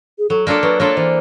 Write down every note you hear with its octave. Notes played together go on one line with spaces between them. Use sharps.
G#4
F#3 A4
A#3 D4 F4 A4
F#3 B4
A#3 D4 F4 A4 C#5
E3 C5